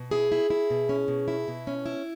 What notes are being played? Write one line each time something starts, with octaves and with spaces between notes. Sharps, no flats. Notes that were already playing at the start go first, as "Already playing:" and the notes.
Already playing: B2
E4 G#4
E4
E4
B2
C#4
B2
E4
B2
C#4
E4